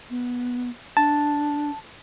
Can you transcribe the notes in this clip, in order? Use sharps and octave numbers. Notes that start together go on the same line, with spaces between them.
B3
D4 A5